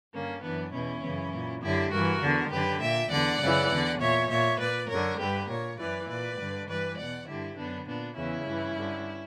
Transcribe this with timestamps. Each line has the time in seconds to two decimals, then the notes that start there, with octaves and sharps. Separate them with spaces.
0.14 G2 D3 A#3 C#4
0.43 F#2 E3 B3 D4
0.73 E2 B2 C#4 E4
1.03 F#2 C#3 E3
1.33 A#2
1.62 F#2 D3 E4 G4
1.92 G2 E3 F#4 A#4
2.22 E2 D3
2.52 F#2 D3 G4 B4
2.82 A#2 E5 G5
3.11 E2 D3 D5 F#5
3.41 F#2 C#3 E3
3.71 E2 D3
4.01 A#2 C#5 E5
4.30 A#2 C#5 E5
4.60 A#2 B4 D5
4.90 F#2 D3 A#4 C#5
5.20 G2 D3 G4 B4
5.49 A#2 A#4 C#5
5.79 F#2 E3 B4 D5
6.09 A#2 B4 D5
6.39 G2 D3
6.69 G2 E3 B4 D5
6.98 E2 B2 D5 F#5
7.28 G2 D3 E4 G4
7.58 F#2 D3 B3 D4
7.88 A#2 B3 D4
8.17 E2 C#3 E3 C#4 E4
8.47 G2 E3
8.77 G2 D3